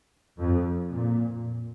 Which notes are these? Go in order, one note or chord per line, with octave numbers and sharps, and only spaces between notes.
F2
A#2